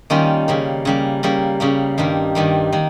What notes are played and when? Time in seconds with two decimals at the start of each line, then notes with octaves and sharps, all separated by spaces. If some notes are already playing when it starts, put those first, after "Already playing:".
0.10 D#3 G3 A#3 C#4 F4
0.48 C#3 G3 A#3
0.85 C#3 G3 A#3
1.23 C#3 G3 A#3
1.60 C#3 G3 A#3
1.98 G2 D#3 G3 A#3
2.35 G2 D#3 G3 A#3
2.72 D#3 A#3